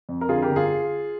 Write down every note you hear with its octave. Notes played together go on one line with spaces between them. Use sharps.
F2
A#4
D3 F4 G#4
G4 A#4
G1
F4 G#4